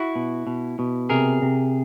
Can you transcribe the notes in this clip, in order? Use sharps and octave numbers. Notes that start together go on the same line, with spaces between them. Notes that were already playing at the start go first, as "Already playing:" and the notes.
Already playing: E4 F#4
B2
B2
B2
C3 G#4 A#4
C3